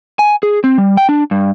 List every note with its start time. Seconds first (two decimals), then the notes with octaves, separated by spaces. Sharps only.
0.19 G#5
0.43 G#4
0.64 C4
0.78 G3
0.97 G5
1.09 D4
1.31 G2